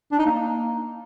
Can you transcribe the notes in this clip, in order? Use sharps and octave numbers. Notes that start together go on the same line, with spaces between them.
D4
D#4
A#3